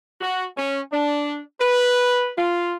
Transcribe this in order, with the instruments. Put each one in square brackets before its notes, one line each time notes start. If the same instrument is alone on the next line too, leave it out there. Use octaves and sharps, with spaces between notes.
[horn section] F#4
C#4
D4
B4
F4